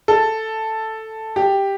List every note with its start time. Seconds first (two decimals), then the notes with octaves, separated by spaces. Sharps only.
0.08 A4
1.36 G4